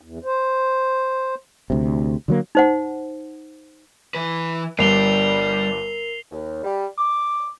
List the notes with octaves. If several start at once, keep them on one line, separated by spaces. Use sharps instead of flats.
E2
C5
D2 C3
D3 F#3 A#3
D#4 C5 F#5
E3 B4
G1 G2 G3 A#4 G5 C7 F7 G7
D#2
G3
D6